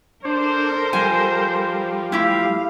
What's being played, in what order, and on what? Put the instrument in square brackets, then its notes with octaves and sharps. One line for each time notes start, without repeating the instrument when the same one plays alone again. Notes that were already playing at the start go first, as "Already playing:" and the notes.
[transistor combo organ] D4 [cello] A4 A#4 [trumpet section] C5
[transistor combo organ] F3 G3 [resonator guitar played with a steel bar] G#5
[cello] A3 F5 [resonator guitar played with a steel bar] E4 G4